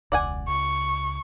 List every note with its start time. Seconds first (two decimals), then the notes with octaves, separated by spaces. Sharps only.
0.12 E1 C#2 D5 F#5 G#5
0.48 C#2 C#6